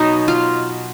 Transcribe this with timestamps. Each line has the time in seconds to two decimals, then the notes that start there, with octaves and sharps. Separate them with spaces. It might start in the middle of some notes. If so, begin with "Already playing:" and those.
Already playing: B2 F#3 B3 D#4
0.28 F4